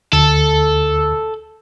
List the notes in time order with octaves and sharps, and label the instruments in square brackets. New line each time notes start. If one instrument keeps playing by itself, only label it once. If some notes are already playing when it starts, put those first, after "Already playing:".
[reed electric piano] D2 [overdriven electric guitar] A4